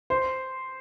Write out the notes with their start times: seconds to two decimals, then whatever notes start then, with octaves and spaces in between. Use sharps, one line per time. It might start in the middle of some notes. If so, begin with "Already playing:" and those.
0.10 C5